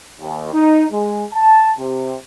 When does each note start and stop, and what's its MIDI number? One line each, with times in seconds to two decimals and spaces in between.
0.19 0.50 39
0.53 0.85 63
0.91 1.24 56
1.33 1.71 81
1.78 2.15 48